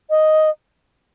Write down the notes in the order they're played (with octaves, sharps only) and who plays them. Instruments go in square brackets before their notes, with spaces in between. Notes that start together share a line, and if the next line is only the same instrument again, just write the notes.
[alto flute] D#5